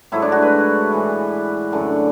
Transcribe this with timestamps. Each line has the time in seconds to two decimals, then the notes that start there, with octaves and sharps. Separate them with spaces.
0.12 G#2 F#3 A3 E4
0.22 D4
0.32 F#4
0.42 B4
0.92 A2 E3 G#3
1.72 F#2 D3 A3